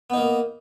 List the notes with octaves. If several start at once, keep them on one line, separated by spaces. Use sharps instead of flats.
A#3 B3 D#4